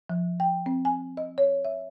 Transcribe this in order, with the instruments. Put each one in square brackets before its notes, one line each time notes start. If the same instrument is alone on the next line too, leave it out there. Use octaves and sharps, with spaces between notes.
[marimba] F3
G5
C4
G#5
D#5
C#5
E5